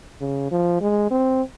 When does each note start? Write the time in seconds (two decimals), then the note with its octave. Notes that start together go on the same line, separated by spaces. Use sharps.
0.21 C#3
0.52 F3
0.81 G#3
1.11 C4